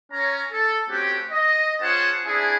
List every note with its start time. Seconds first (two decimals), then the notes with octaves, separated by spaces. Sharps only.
0.12 C#4 C#5 A#5
0.52 A4
0.89 A3 C4 C#4 F#4 G4
1.31 D#5
1.81 C#4 F4 G#4 C5 F#5 A5
2.26 C4 D4 E4 G#4